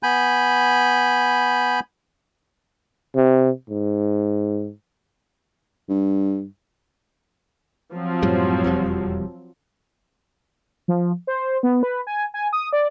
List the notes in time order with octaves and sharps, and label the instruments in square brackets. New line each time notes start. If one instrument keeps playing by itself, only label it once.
[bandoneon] B3 G#5 B5 G6
[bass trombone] C3
G#2
[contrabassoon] G2
[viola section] F3 F#3 C4
[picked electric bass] F#2 A2 G3
E1 F2 G3
[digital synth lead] F3
C5
B3
B4
G#5
G#5
D#6
D5